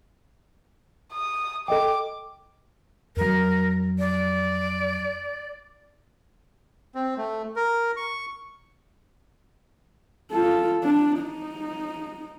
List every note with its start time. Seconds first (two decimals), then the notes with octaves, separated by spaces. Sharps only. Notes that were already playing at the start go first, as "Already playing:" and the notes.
1.13 D#6
1.68 A4 D#5 G5 D6
3.17 F2 F#3 A#4
3.99 D5
6.95 C4
7.17 A3
7.56 A#4
7.97 C#6
10.31 F4 A4
10.83 D4
11.20 D#4